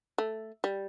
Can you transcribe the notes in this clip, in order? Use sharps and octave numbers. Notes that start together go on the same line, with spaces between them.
A3
G3